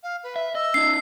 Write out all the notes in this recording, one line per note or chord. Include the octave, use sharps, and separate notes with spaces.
F5
B4
E5
D#5 E6
C#4 D#4 C7